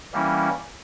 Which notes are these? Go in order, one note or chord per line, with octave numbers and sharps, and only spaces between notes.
E3 G3 A#3 C#4 E4